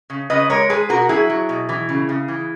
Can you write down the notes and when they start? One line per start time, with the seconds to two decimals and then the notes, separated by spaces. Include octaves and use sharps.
0.10 C#3
0.30 C#3 B4 D#5
0.50 G#3 A#4 C#5
0.70 G#3 G#4 B4
0.89 B2 F#4 A#4
1.09 F#3 E4 G#4
1.29 F#3
1.49 B2
1.69 E3
1.89 C#3
2.09 C#3
2.28 E3